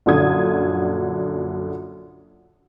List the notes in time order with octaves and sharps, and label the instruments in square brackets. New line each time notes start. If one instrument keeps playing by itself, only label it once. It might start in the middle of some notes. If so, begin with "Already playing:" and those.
[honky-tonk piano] A#1 F#2 D3 D#6 G#6